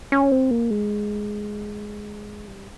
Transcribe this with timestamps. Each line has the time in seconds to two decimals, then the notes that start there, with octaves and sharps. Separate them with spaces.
0.12 C#4
0.32 C4
0.51 A#3
0.71 G#3
2.48 G3